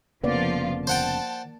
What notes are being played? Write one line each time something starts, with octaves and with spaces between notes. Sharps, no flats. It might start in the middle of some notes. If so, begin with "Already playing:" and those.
F1 C#3 F3 A#3 B3 F4 D5
C5 F#5 G5 A5